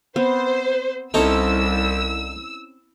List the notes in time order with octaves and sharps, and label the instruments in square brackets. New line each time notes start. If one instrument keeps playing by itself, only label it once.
[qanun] B3 C4 [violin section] C5
[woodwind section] C2 [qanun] C4 C#4 E4 [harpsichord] D#4 A4 C#5 [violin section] E6